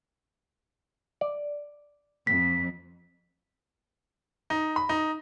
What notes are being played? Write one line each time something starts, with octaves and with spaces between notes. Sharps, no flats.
D5
F2 B6
D#4
B5
D#4